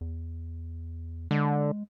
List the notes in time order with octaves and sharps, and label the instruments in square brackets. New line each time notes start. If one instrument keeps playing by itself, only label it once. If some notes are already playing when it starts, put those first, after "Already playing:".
[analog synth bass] E2
[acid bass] D3 [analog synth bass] G#3